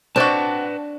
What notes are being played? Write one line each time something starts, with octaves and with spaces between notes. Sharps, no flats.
C4 D4 F#4 B4 D5 A5